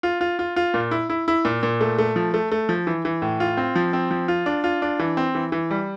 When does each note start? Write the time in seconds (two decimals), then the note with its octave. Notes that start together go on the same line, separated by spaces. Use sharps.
0.03 F4
0.21 F4
0.39 F4
0.56 F4
0.74 A#2
0.91 E4
1.10 E4
1.28 E4
1.45 A#2
1.63 A#2
1.81 A3
1.98 A3
2.16 F3
2.34 A3
2.52 A3
2.69 F3
2.87 E3
3.05 E3
3.22 A2
3.40 F4
3.57 C4
3.76 F3
3.93 C4
4.11 F3
4.28 F4
4.46 D4
4.64 F4
4.82 D4
4.99 E3
5.17 C4
5.35 E3
5.52 E3
5.71 G3